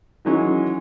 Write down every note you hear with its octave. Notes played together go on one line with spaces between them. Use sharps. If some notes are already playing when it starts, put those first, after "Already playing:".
D#3 E3 F#3 G#3 C#4 D#4